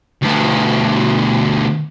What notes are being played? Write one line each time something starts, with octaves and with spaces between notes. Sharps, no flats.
D2 B2